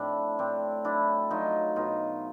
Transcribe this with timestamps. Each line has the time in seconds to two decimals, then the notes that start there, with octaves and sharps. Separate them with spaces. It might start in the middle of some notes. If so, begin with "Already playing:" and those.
Already playing: A2 F3 C4 D4 E4
0.38 A2 C4 D4
0.84 F#3 D4 E4
1.30 F#3 D#4 F4
1.76 B2 D#4 F4